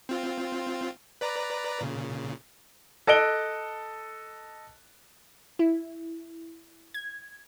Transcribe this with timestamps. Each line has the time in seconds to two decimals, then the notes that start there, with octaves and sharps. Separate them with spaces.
0.09 C4 F4
1.21 B4 D5 A#5
1.81 A#2 C#3
3.07 A4 D#5 F#6 D7 G7
5.59 E4
6.94 G#6